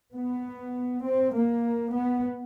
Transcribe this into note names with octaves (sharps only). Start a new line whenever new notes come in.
B3
C4
A#3
B3